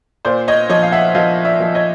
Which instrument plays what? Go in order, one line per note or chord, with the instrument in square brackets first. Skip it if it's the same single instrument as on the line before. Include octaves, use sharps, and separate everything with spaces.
[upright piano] A#2 C5 D5
C#5 D#5
F3 C#5 D#5
F5
E5 F#5
F3 D#5 F5
D5 E5
F3
C#5 D#5